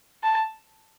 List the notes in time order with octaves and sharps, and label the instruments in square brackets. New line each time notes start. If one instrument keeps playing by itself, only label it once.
[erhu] A5